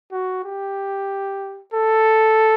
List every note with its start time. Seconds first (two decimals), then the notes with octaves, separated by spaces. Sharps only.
0.12 F#4
0.44 G4
1.74 A4